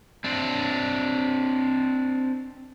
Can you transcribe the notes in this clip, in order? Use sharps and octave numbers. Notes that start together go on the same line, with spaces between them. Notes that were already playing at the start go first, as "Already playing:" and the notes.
C4 D4